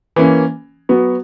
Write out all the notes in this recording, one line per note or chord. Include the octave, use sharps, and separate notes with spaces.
E3 A#3 C#4
F#3 B3 F#4